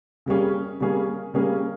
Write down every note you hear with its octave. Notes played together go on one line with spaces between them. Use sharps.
C#3 G3 A#3 C#4 G#4
C#3 G3 A#3 C#4 G#4
C#3 G3 A#3 C#4 G#4